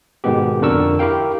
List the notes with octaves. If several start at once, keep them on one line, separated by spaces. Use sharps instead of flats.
G#2 B2 D#3 G#3 B3 G4
F2 D3 D4 A#4 C#6 E6
E4 G4 A#4 F5 G5